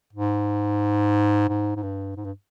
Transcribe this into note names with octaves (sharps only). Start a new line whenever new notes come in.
G#2
G#2
G#2
G2
G#2
G2